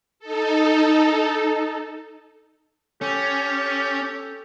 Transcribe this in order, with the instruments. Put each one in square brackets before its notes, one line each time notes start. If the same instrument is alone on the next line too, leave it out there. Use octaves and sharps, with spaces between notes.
[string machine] D#4 A4
[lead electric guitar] C#4 [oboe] G4 [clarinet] A4